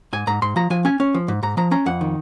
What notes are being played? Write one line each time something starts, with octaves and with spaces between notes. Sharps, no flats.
G#2 G#5
G#2 A#5
G#2 C6
F3 A#5
F3 G#5
C#4 G#5
C#4
F3
G#2
G#2 A#5
F3 A#5
C#4 A#5
F2 F#5
D#3